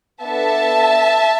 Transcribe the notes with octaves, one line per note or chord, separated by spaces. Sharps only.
B3 D4 A4 E5 A5